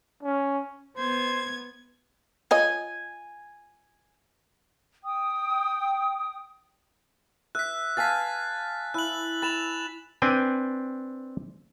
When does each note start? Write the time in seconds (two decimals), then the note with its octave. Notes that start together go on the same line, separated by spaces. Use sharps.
0.23 C#4
0.97 B3 C5 G#6
2.51 F4 C#5 D#5 G#5
5.04 G5 D#6
7.55 E5 F#6 B6
7.97 F5 G#5 A5 A6 B6
8.94 E4 F#6 F#7
9.42 B5 A6 E7 F7
10.22 C4 D4 B4 G5 G#5